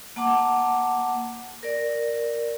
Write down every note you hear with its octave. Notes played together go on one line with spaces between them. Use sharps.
A#3 F#5 A5 D6
A#4 D5